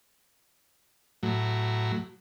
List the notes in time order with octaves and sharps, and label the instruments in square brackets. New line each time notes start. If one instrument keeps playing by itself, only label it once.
[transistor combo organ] A2 F#3